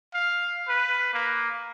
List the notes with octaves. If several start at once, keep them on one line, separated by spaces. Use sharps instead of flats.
F5
B4
A#3